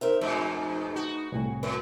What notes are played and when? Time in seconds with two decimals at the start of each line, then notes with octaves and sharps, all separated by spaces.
0.01 D#4 A#4 C5 E5
0.21 F2 G#2 B2 A3
0.96 F#4
1.32 C2 A2 G#5
1.63 F2 B4